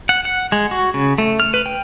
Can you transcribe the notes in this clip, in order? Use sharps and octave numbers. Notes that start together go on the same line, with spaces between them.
F#5
F#5
G#3
F#4
C#3
A3
F6
B4
G5